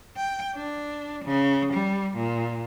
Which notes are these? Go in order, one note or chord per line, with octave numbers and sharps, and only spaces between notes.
G5
D4
C#3
G3
A#2